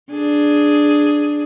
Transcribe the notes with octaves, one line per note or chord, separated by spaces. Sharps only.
D4 G#4